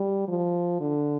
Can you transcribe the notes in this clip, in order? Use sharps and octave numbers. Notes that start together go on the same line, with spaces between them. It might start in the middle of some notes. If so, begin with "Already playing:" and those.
Already playing: G3
F3
D3